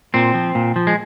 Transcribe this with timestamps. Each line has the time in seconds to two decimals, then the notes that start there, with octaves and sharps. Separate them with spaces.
0.14 A#2 C4
0.34 F3
0.55 A#2
0.76 F3
0.87 G#3